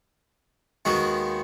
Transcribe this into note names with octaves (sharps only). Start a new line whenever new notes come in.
D#2 D#3 G#3 B3 F#4